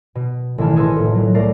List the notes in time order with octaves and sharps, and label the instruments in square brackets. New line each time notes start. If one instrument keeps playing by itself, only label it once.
[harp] B2
A1 B2 D#3 E4 A5 F6
G#4 A4 B4 D#5 C6
F1 A#1 A2
F#3
C2 A3 A#4 D5 A6 C7